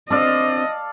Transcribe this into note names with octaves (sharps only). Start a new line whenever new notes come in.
C4 D4 A4 C5 D5 D#5 F5